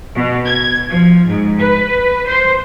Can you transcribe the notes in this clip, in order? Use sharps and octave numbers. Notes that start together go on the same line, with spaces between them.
B2
G#6
F3
G#2
B4
C5